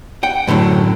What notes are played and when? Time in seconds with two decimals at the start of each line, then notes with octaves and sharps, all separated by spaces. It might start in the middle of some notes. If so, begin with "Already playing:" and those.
0.23 F#5 G5
0.47 F#2 A2 D3 F3 F#3